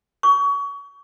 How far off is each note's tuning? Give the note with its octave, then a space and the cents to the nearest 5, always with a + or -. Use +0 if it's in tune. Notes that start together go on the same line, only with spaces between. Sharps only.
C#6 +30